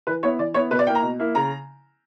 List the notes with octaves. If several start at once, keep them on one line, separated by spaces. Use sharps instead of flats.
E3 B4
B3 E4 C#5
E3 D5
B3 E4 C#5
B2 B4
D5
A#3 E4 G5
A#5
B2
A#3 E4
C#3 A#5